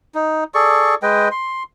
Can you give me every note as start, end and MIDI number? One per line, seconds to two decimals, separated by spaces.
0.15 0.44 63
0.54 0.95 68
0.54 0.95 69
0.54 0.95 74
0.54 0.95 85
1.03 1.29 56
1.03 1.29 71
1.03 1.29 75
1.03 1.29 79
1.31 1.63 84